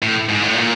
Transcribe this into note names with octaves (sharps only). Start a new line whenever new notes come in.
A2
G#2
A2
A#2